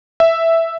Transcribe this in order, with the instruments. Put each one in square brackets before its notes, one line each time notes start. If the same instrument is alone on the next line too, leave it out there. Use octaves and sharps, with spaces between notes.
[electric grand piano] E5